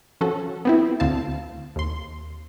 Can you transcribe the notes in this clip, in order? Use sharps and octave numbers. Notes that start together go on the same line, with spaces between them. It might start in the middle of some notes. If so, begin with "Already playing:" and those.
F3 C#4 F#4 A4
B3 C4 E4
D2 C4 F5 A5
D#2 C6